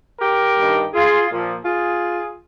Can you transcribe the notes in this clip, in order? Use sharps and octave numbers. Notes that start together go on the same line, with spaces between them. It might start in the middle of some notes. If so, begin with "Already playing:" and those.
G4 A#4
G2 D#3
F4 G#4
A#2 F3
F4 G#4